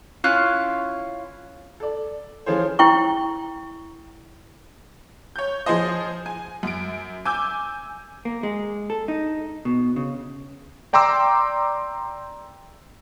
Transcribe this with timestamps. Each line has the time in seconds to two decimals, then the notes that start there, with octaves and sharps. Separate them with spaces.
0.24 C#4 E4 F4 F#6
1.80 A4 D5
2.46 E3 F3 C#4 F4 G#4 C5
2.79 E4 G5 C#6
5.36 C#5 G6
5.66 F3 G#4 C5 D#5
6.26 G#5
6.63 F#2 D7
7.25 G#5 D6 E6 G6
8.25 A#3
8.43 G#3
8.90 A4
9.08 D#4
9.65 B2
9.96 C#3
10.93 D5 G5 A#5 C6 D6 E6